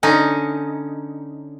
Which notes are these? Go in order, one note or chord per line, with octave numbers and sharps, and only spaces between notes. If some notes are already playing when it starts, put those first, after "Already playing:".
D3 C#4 D#4